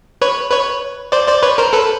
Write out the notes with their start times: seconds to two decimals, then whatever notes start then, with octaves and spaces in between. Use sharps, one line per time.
0.22 B4 C#5
0.51 B4 C#5
1.12 C5 D5
1.28 C5 D5
1.43 B4 C#5
1.58 A#4 C5
1.73 A4 B4